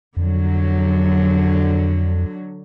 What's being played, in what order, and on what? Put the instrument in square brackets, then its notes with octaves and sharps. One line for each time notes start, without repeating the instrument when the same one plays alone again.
[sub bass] F2 [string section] D3 F#3